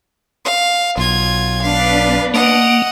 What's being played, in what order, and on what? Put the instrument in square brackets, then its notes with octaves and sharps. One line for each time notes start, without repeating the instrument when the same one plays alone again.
[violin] F5
[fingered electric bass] B1 [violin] F4 G#6
[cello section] B3 D4 B4 [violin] F5
[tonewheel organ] A#3 [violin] D#5 F#5